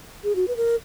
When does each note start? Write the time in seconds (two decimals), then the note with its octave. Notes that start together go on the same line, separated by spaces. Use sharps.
0.24 G#4
0.36 F#4
0.48 B4
0.57 A#4